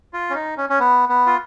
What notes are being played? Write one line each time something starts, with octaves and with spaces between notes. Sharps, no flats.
F4
C#4
D#4
C#4
C#4
B3
B3
F4